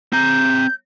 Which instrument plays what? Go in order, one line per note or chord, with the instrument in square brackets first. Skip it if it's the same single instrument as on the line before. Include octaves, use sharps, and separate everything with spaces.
[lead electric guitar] C4 A#5 [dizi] G6